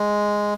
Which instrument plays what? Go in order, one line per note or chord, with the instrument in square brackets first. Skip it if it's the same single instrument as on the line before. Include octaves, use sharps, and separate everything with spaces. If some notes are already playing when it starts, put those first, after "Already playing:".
Already playing: [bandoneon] G#3